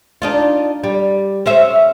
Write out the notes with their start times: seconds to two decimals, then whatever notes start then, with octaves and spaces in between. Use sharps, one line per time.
0.22 D4 D#4 F4
0.83 G3
1.46 C#4 C5 E5